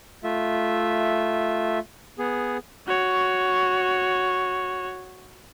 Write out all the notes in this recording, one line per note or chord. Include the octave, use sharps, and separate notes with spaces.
A3 F4 E5
B3 G#4
F#4 C#5